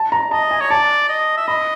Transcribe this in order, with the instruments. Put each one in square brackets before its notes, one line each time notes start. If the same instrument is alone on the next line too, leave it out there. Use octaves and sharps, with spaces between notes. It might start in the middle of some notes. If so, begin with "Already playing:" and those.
Already playing: [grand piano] A5
A#5
[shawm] D#5 [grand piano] A5
[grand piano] G#5
[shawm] C#5
[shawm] D5 [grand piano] A5
[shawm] D#5
E5
[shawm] D#5 [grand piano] B5